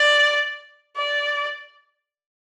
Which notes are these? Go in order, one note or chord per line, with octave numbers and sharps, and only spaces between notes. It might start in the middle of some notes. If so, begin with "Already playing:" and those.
Already playing: D5
D5